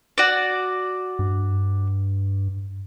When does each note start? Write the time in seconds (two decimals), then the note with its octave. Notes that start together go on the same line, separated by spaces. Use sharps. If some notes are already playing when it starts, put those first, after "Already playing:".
0.18 F#4 D5
1.19 G2